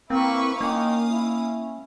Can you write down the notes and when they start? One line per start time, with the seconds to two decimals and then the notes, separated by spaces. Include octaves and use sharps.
0.10 A#3 C4 E4 B4 C#6
0.61 D#3 A#3 C#4 F5 D#6
1.11 E4